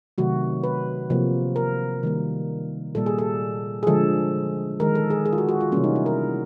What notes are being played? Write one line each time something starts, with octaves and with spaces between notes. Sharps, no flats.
C3 D#3 F#3 A3 F#4
B4
C3 F3 A#3
A#4
D#3 G3 A#3
A#2 G3 A#3 A4
G#4
A4
G#4
D3 F3 G#3 A4
D#3 G#3 A#4
A4
G#4
G#4
F4
F#4
F#4
F4
C3 E3 G3 A#3 C#4
D#4
E4
A#4